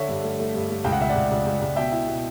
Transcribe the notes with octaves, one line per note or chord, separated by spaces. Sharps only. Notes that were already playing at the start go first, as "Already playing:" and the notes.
Already playing: D3 C#5 E5
G2
A3
A3
G2
A3
C#2 G5
F#5
C#2 E5
D5 F#5
C#2
C#2
C#2
C#2
B2 E5 G5
E4
B2